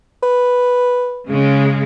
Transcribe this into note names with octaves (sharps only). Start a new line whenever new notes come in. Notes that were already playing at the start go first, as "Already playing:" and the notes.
B4
C#3 G#3